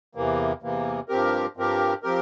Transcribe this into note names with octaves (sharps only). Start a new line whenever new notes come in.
E2 C3 E3 A#3
E2 C3 E3 A#3
G2 F3 C4 G4 A#4
G2 F3 C4 G4 A#4
F3 C4 G4 A#4